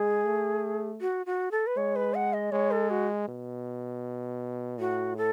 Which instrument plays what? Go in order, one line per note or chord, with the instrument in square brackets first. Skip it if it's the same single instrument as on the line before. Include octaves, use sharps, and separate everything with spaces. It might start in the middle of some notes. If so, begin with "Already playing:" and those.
Already playing: [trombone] G#3 [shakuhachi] G#4
[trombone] A3
[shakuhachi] F#4
F#4
A4
B4
[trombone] G#3 [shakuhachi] C#5
[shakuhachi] B4
F#5
D#5
[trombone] G#3 [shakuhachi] C#5
[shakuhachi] A4
F#4
[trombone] B2
[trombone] A2 [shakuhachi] F#4
[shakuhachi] A4